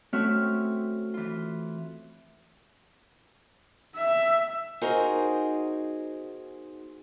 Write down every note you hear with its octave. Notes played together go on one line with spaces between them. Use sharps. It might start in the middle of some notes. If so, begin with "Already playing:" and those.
A3 C4 C#4 F#4 E5 F6
E3 F4
E5
B3 D#4 F#4 G#4 A#4 C5